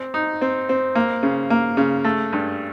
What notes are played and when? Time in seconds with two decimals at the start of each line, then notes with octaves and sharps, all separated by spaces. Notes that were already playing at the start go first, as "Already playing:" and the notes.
Already playing: C4
0.14 D#4
0.41 C4
0.69 C4
0.95 A#3
1.23 C#3
1.50 A#3
1.77 C#3
2.04 A3
2.33 G2